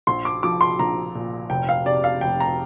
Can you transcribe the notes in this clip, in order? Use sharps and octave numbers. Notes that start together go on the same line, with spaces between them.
A#1 C6
D6
F3 D6
C6
A#1 A#5
A#2
F1 G5
F5
C3 D5
F5
F1 G5
A#5